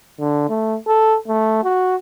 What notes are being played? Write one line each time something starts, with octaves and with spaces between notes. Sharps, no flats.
D3
A3
A4
A3
F#4